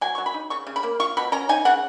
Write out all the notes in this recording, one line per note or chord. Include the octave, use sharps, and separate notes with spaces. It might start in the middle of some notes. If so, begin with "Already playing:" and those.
F#3 G#5
F#3 C#6
B5
D#4
C#3 C#6
C#3
B5
A#3
F4 C#6
B2 B5
C#4 A#5
D#4 G#5
C#3 F#5